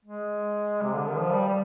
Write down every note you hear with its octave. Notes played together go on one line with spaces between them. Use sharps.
G#3
C3
D3
D#3
F3
G3
G3